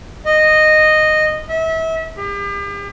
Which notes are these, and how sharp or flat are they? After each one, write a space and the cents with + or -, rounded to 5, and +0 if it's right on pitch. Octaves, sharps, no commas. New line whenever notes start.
D#5 -10
E5 -30
G4 +40